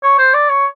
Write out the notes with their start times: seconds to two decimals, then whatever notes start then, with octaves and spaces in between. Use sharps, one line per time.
0.03 C#5
0.18 C5
0.34 D5
0.49 C#5